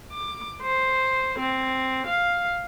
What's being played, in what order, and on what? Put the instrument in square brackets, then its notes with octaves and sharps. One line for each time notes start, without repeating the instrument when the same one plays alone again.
[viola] D6
C5
C4
F5